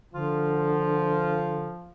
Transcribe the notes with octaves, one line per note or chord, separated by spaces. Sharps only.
D3 F3 F4